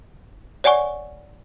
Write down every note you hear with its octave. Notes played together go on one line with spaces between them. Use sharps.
C#5 D5 F#5 G#5 C#6